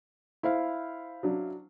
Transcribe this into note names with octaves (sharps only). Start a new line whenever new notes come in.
E4 C5 F5
F#3 D4